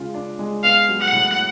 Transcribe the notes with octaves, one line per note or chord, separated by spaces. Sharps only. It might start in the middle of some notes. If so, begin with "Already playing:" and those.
Already playing: C#3 G#3 F4
D4
G#3
B3 F5
F#3
F#5
A2